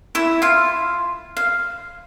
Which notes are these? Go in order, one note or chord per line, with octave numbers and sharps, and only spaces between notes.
E4 E5
F4 F5
F5